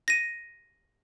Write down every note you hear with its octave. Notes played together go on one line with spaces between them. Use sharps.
A#6 D#7